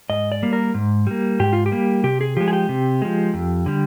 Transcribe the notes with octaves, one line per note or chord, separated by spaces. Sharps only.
G#2 D#5
D5
G3 A#3
A#4
G#2
G3 A#3
G#2 G4
F4
G4
G3 A#3
C3 G4
G#4
F3 G#3 G4
G#4
G4
C3
F3 G#3
F2
D3 G3